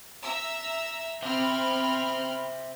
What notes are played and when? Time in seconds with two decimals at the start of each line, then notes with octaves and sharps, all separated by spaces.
0.22 E5 A#5 E6
1.23 C4 C5 E5 B5 F6